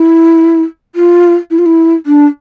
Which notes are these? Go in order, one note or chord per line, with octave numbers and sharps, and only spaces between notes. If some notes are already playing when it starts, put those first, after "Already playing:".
Already playing: E4
F4
E4
F4
E4
D4